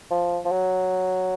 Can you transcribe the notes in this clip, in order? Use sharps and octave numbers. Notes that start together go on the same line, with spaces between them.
F3
F3
F#3